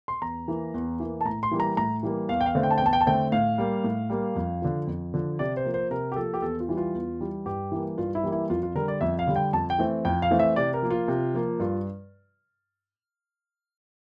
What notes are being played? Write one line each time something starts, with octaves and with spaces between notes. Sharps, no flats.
C6
E2 A#5
E3 A#3
E2
E3 A#3
A5
A2 A#5
C6
E3 G3 A#3
A#5
A2 A#5
E3 G3 A#3
E2 F5
G5
F5
D3 A3 C4
G5
A5
G5
E2 A5
G5
A5
D3 A3 C4 G5
A2 F5
G3 A#3
A2
G3 A#3
F2
D3 F3
F2
D3 F3
C3 D5
C5
F3 A#3
C5
C3 A#4
G4
F3 A#3 A4
G4
E2 A4
F4
E3 G3
F4
E2
E3 G3
G2 G4
E3 G3 A#3
G2 F4
E4
E3 G3 A#3
E4
F2 F4
F4
D3 G3 A#4
D5
F2 E5
F5
D3 G3
G5
F2 A5
G5
E3 A3 C4
F2 G5
F5
E3 A3 C4
E5
C3 D5
A#4
F3 A#3
F4
C3
F3 A#3
G2 F4